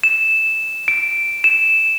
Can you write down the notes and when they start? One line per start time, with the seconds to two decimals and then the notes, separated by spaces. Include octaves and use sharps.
0.03 E7
0.88 D7
1.44 E7